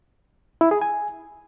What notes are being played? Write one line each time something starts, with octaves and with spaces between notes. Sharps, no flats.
E4
G#4
G#5